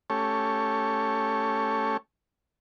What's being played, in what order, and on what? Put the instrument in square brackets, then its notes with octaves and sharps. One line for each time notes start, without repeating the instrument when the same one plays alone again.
[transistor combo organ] A3 C#4 G4 A4 C#5